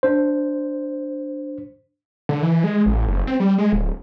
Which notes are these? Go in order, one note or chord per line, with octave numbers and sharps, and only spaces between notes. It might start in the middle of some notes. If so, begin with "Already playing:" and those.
D4 C5
D3
E3
G#3
A1
F#1
C4
G3
G#3
D1